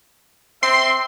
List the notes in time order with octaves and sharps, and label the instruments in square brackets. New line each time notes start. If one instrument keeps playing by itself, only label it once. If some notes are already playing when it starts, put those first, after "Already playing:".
[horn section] C4 E5 [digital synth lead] C6